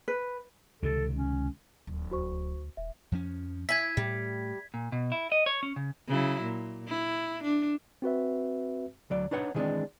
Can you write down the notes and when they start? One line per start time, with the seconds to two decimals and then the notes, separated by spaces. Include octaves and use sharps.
0.08 B4
0.82 C#2 C3 D#3 A4
1.15 C#4
1.87 D1 D#2
2.11 F#4 C5 C#6
2.32 D2
2.77 D#1 E5
3.12 F2 F3 C#4
3.69 E4 G#5 G#6 B6
3.97 A2 G3
4.74 A#2
4.92 B2
5.12 E4
5.32 D#5
5.46 C#5
5.63 C#4
5.76 C#3
6.08 C#3 F#3 E4
6.43 A#2
6.88 E4
7.43 D4
8.02 C4 F#4 B4 E5
9.10 D2 F#3 D5
9.31 D4 D#4 B4 C#5 F#5
9.55 D#3 E3 G#3 A#3 C4 D4